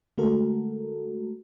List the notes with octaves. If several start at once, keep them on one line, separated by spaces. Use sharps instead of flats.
D3 G#3 A3 F#4 A4 A#4